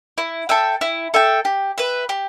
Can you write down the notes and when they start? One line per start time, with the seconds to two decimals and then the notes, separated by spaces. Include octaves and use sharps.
0.18 E4
0.49 A4 E5 G5
0.81 E4
1.14 A4 E5 G5
1.45 G4
1.78 B4 E5
2.09 G4